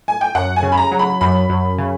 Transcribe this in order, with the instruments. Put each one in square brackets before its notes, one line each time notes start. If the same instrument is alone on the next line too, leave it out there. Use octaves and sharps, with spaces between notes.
[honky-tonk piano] G#5
G5
[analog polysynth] F#2 [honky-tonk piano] F#5
[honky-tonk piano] G#5
[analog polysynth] C#3
[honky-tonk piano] B5
A#5
[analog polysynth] F#3
[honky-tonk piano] B5
[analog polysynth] F#2 [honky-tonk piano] B5
[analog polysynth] F#2
C#3